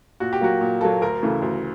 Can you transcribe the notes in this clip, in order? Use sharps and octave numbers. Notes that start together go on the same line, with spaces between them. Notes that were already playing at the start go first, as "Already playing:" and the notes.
A#2 F#4
G4
F#3 A#3 F#4
A#2
F#3 A#3 A4
D2 A#4
C#3 E3 A3
D2